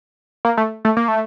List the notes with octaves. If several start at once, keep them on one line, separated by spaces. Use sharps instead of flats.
A#3
A3
A3
A#3
A3